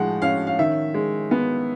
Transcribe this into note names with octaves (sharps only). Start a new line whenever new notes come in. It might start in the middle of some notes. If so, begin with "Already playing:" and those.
Already playing: A2 F3 G#3 F#5
C#4 F5
F5
D#3 E5
G#3
B3